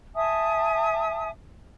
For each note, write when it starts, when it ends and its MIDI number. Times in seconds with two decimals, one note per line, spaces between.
0.15 1.29 76
0.15 1.29 80
0.15 1.29 81
0.15 1.29 87